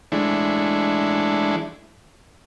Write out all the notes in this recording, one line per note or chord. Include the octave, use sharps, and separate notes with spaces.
E3 G#3 A3 D4 E4